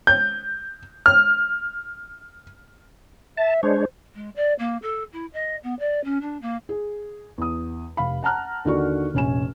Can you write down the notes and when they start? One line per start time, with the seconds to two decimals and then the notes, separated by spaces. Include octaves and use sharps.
0.07 G6
1.06 F6
3.38 E5 A5
3.63 G#3 D4 C5 C#5
4.15 G#3
4.35 D5
4.58 A#3
4.82 A4
5.12 E4
5.33 D#5
5.63 B3
5.79 D5
6.04 C#4
6.21 D4
6.41 A#3
6.69 G#4
7.38 E2 D#6
7.97 F1 F5 B5
8.23 F#5 A5 A#5 F6 F#6
8.65 D#2 D3 D#3 F#4 D5 C#6
9.14 F1 A#1 C#4 G#5 E7